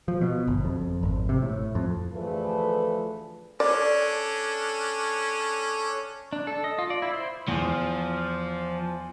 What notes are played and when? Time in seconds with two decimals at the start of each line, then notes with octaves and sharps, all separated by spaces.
0.08 F3
0.21 B2
0.47 G1
0.65 F2
1.03 G#1
1.29 C3
1.42 A2
1.75 F2
2.14 D2 E3 F3 A3 G#4 B4
3.60 C#4 D4 A4 C#5 D5
6.33 D4
6.47 A4
6.64 D#5
6.78 F4
6.90 D5
7.02 E4
7.13 C5
7.48 E2 F3